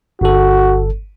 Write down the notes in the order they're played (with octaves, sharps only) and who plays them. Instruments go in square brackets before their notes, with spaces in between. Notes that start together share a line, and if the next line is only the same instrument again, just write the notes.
[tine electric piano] G1 A4 [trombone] F#4